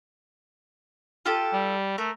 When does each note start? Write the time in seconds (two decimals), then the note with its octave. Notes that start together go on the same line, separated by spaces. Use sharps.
1.26 F4 G4 A4
1.53 G3
1.98 A3 A#4